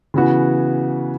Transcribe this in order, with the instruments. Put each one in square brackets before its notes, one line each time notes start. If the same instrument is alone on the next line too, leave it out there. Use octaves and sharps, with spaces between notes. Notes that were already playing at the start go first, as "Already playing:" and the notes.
[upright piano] C#3 E3 B3 F#4